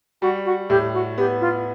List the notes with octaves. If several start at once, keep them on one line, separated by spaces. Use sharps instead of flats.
G3 F#4
F#4
A2 G4
F#4
B3 G4
F4